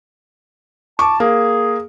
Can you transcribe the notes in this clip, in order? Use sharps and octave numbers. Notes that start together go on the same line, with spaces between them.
A5 C#6 D6
A#3 G#4